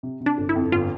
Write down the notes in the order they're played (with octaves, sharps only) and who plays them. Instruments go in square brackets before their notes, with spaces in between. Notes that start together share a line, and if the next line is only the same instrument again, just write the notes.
[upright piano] C3
C3
[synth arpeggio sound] D4
[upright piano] G1
[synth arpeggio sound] E4
[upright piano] F2
[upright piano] G1 [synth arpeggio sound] F4